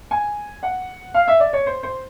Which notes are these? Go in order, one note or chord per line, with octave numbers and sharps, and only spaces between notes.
G#5
F#5
F5
E5
D5
C#5
C5
C5